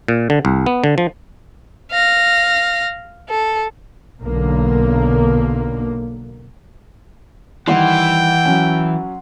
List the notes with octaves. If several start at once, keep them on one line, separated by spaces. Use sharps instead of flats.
A#2
D3
C2
B3
D3
F3
F5 A#6
A4
B1 D3 A#3
D#3 E3 G3 F#5 G5 C6
F#3 C#4